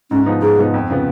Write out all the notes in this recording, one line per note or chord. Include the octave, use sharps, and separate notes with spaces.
G#2 C#4
F3 B3 D#4
G#2 G#4
F3 B3 D#4
F2
C#3 F3 B3